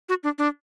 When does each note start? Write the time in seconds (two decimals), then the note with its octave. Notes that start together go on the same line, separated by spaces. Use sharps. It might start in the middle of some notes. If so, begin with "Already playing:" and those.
0.09 F#4
0.23 D4
0.38 D4